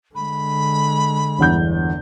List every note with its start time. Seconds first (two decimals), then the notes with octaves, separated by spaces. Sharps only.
0.15 D3 G#3 B5
1.39 G1 E2 G6